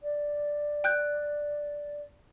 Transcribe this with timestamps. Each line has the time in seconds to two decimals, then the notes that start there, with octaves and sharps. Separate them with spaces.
0.02 D5
0.84 G5 F#6 G6